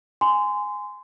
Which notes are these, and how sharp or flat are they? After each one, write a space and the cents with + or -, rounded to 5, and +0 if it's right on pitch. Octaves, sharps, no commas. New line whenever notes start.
G#5 +0 C6 -25